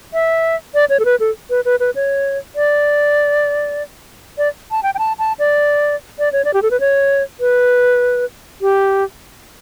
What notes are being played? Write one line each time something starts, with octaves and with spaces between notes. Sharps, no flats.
E5
D5
C#5
A4
B4
A4
B4
B4
B4
C#5
D5
D5
A5
G5
G5
A5
A5
D5
D5
C#5
D5
G4
A4
B4
C#5
B4
G4